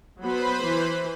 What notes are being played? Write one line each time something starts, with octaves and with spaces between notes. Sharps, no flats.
F#3 B3 B4 C5 B5
E3